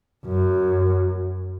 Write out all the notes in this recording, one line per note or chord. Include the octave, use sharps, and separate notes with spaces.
F#2